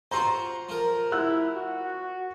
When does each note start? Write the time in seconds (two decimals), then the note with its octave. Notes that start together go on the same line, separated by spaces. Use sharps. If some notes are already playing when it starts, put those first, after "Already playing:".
0.11 F4 F#4 C5 A#5 C6
0.69 F3 A#4
1.12 E4 F#5 E6 F#6
1.55 F#4